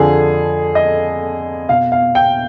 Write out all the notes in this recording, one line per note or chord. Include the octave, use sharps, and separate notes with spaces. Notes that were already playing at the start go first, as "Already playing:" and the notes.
Already playing: F2 D3 F3 G#4
D#5
B2 F5
F5
G5